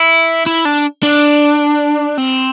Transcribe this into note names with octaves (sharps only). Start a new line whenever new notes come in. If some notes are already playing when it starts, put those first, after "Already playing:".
Already playing: E4
E4
D4
D4
C4